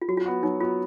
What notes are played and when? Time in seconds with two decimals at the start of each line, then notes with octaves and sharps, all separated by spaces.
0.02 F4
0.08 F#3 F#4
0.17 F4
0.26 B3 F#4
0.43 F#3 D#4
0.60 B3 F4
0.64 F#4